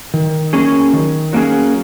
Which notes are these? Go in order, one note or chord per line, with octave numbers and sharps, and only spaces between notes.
D#3
F#3 A#3 C#4 G#4
D#3
F#3 A#3 C#4 G#4